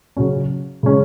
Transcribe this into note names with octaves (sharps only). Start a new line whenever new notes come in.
C#3 F#3 C#4
C#3 G#3 C#4